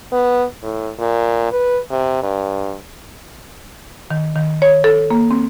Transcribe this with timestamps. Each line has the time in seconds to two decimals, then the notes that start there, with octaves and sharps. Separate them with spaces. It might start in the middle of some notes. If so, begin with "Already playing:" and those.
0.13 B3
0.63 A2
0.99 A#2
1.52 B4
1.91 C3
2.23 G2
4.11 D#3
4.35 D#3
4.62 C#5
4.84 A4
5.11 A#3
5.31 C4